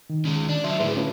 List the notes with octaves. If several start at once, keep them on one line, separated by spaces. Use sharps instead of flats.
D#3
C#3 G#3
D4
F#3 C5 E5
A2 D3 G#4 B4
C#4 F4 B4